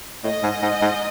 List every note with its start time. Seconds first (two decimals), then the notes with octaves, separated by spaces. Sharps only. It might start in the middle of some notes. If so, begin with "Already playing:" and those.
0.24 A2 D#5
0.43 G#2
0.63 G#2
0.82 G#2